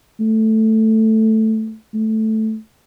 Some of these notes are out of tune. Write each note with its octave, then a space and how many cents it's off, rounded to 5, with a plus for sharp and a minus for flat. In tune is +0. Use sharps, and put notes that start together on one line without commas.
A3 +0
A3 -5